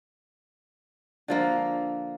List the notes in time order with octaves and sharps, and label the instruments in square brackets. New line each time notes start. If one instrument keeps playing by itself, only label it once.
[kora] D3 F3 A#3